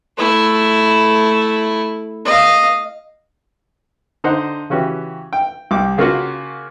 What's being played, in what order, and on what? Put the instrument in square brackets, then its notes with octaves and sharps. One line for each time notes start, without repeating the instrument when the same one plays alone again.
[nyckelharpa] A3 E4
D#5 F5
[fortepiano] D3 D#4 C5 F#5
C#3 E3 C#4 F#4 G4
G5
C2 D6
C#3 A#3 C#4 F4 F#4 F#5